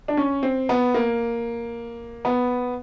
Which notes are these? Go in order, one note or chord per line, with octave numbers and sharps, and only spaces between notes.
D4
C#4
C4
B3
A#3
B3